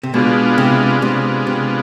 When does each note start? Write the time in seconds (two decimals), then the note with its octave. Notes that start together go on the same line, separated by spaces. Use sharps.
0.03 C3
0.14 B2 G#3 B3 D4 F4
0.58 C3
1.02 C3 G#3 B3 D4 F4
1.47 C3